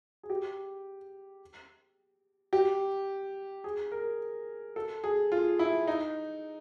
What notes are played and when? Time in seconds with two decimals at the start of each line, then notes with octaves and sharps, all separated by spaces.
0.23 G#4
0.30 G4
2.53 G4
3.64 G#4
3.92 A#4
4.76 A4
5.04 G#4
5.32 F4
5.59 E4
5.87 D#4